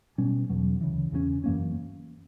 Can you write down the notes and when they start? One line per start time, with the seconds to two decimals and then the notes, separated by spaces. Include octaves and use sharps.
0.18 B2 G3 C#4
0.50 E2 B2 F#3
0.81 D2 C#3 E3
1.12 E2 C#3 F#3 C#4
1.44 F#2 E3 A#3 C#4